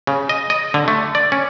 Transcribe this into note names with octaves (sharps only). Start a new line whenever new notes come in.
C#3
D#5
D#5
D3
A3
D5
C#4